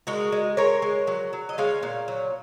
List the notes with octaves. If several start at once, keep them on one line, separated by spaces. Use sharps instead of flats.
G#3 F#4 A#4
G#3
G#3 A#4 C#5
G#3
F#3
F#3
D#5
G#3 C#5 F5
A#2
F#3